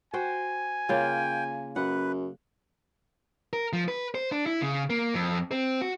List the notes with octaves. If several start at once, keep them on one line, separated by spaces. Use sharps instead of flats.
F#4 C5 G5 G#5
C#3 A#3 F4 G5
F#2 B4 F#5
A#4
F3
B4
C5
D4
E4
C#3
A#3
F2
C4
F#4